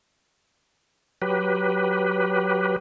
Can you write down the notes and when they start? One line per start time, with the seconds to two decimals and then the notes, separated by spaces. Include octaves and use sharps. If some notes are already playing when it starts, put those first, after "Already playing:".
1.22 F#3 G4 B4